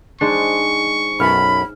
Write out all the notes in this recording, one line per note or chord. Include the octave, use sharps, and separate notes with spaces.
G#3 D4 D#4 C5 C#6
B1 F#2 B5 F6 A6